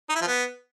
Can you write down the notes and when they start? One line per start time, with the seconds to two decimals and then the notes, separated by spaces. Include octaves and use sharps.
0.10 D#4
0.16 E4
0.22 F3
0.28 B3